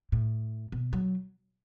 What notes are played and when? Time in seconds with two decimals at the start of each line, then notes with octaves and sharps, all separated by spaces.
0.12 A2
0.72 B2
0.93 F#3